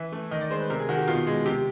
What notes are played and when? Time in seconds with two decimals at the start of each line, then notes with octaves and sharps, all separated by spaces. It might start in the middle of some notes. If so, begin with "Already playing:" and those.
Already playing: E3 E5
0.12 A3
0.31 D#3 D#5
0.41 D5
0.50 G#3 C5
0.60 B4
0.70 C3 A#4
0.79 G#4
0.89 D#3 F#4
0.98 G4
1.08 B2 F4
1.27 G#3
1.46 C3 G4